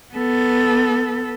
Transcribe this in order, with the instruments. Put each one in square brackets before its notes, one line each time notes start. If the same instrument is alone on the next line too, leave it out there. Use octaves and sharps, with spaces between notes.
[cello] B3 A4